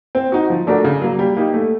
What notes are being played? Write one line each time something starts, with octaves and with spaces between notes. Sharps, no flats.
C4
D#4 F#4
F3
A3 D4 F#4 A#4
C#3
F#3 A#3
G3
A#3 D#4 G4
A3